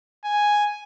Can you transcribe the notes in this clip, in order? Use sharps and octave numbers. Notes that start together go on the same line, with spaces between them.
G#5